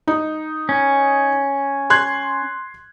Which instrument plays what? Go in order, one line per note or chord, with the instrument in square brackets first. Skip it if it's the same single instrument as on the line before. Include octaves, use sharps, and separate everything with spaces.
[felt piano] D#4
[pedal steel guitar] C#4
[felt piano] C6 F#6 G#6